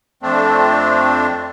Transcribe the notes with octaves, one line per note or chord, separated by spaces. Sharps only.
F2 A3 C4 D4